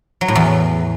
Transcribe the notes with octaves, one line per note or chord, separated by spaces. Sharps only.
F#3
A2
E2